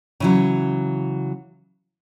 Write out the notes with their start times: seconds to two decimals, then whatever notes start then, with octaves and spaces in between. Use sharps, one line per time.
0.20 C#3 E3 F#3